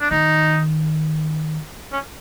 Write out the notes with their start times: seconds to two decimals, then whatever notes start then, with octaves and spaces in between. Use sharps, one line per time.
0.01 D4
0.11 D#3 D#4
1.92 C#4